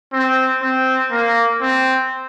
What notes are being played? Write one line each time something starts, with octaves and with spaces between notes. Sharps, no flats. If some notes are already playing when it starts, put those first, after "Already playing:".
C4
C4
A#3
C4